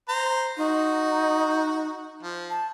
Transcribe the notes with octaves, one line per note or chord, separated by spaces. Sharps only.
C5 A#5
D#4 F#4
F3
A5